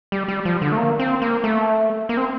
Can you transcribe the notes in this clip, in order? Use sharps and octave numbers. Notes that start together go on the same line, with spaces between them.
G3
G3
F3
D3
A3
A#3
C4
A#3
A3
A#3
C4